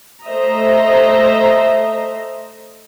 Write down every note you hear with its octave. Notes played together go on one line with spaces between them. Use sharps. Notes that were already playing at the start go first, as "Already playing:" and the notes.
A3 C5 D#5 E5 A#5